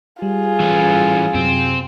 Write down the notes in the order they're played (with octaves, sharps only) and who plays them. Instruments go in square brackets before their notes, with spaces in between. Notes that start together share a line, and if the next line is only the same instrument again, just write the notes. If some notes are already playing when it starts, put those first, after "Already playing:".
[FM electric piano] G3 [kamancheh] F4 G#4
[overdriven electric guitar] E3 C#4
[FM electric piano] F#2 C3 F#3 [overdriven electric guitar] C4